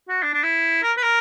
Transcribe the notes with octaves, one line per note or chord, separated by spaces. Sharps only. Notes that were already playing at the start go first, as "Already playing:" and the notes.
F#4
D4
D4
E4
A#4
B4
A#4